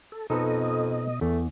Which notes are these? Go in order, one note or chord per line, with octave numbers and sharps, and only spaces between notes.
A4
F2 B2 D#4 A4 B4 D#5
E2 A3